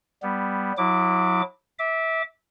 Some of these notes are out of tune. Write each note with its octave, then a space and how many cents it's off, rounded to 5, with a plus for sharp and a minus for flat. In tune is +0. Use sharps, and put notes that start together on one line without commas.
G3 +0 B3 +0
F#3 -30 E4 -15 D6 +0
E5 -20 D6 +0